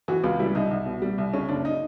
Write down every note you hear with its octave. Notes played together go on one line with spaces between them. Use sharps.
E3 F#4
C#2 F4
G3 E4
C2 D#4
C2
B2
G3
C2
C#3 C#4
F#1 D4
D#4